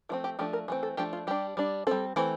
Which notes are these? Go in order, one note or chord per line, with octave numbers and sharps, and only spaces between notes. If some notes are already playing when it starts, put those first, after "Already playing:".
F3 A3 C4 E4
G4
F3 A3 D4 G4
A#4
E3 A3 C4
A4
F3 A3 D4 G4
F4
G3 D4 G4
G3 D4
G3 C4 A4
E3 A3 C4